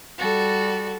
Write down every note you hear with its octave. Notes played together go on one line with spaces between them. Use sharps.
G3 F#4 A4